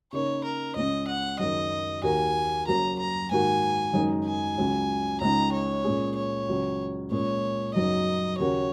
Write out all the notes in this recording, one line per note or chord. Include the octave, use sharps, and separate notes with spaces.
C#3 A#3 D#4 C#5
A#4
C#2 C#3 G#3 C#4 D#5
F#5
F#1 F#2 D#3 D#5
D#2 D#3 A#3 F#4 A#4 G#5
F#1 F#2 F#3 A#3 A#5
A#5
G#2 D#3 A#3 F#4 G#5
F#1 F#2 D#3 G#3 D#4
G#5
C#2 C#3 F#3
C#2 C#3 G#3 D#4 A#5
C#5
A#2 G#3 C#4 G#4
C#5
C#2 C#3 F#3
A#2 G#3 C#4 A#4 C#5
F#1 F#2 F#3 D#4 D#5
D#2 C#3 A#3 F#4 A#4 C#5